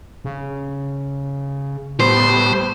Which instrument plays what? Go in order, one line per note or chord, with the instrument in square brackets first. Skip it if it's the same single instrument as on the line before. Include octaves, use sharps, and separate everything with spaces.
[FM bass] C#3
[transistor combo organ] A2 G3 B3 [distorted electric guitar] C5